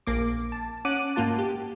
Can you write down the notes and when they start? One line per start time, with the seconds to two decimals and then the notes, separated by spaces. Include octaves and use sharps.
0.07 A#1 A#3 D6
0.52 A5
0.85 C#4 F#5 D6 F#6 D#7
1.16 G#2 A#3 F4 A5
1.39 G4